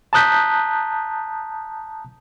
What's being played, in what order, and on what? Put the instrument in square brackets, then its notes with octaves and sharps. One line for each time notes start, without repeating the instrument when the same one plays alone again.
[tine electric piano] A5 A#5 D#6 F#6 G6 B6